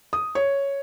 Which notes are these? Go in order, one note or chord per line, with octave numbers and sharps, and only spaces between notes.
D#6
C#5